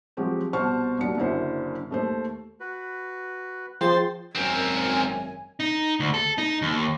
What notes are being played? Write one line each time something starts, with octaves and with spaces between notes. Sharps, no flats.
F3 F#3 G#3 C4 F#4 G4
C2 B2 C5 A5 C#6 F6
E1 D#2 F#3 D4 C#7
F#1 F#2 D3 E4 C5
D#2 A3 C5
F#4 B4
F3 G#4 C5 G5 A6
G#1 F#2 C4 A#4 G#5
D#4
D2
A4
D#4
D#2